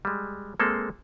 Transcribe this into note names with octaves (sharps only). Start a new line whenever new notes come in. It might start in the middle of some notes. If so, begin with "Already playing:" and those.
G3 G#3
G#3 A#3 C4 A4